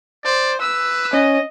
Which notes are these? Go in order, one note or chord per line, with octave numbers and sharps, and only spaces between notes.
C5 D5
B4 E6
C#4 D#5